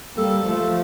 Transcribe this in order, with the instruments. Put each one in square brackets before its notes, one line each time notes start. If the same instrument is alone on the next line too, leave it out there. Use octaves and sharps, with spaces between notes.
[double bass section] G3 A#3 [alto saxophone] A4
[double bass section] F3 A3